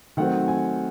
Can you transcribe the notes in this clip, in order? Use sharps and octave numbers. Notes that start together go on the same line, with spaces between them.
D#3 F#3 A3 C4 F#5
G#5